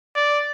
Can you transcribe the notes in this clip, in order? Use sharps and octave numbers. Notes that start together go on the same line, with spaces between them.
D5